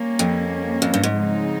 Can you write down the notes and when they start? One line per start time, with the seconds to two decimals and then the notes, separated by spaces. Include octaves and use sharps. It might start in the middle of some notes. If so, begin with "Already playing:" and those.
Already playing: G3 A#3 C#4
0.19 F2
0.82 F2
0.94 G2
1.03 G#2
1.14 C#3 F3 G#3 C4 D#4